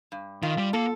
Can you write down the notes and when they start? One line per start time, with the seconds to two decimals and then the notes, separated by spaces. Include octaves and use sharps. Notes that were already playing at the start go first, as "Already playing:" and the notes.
0.12 G2
0.43 D#3 F4
0.58 G3
0.73 A#3 A4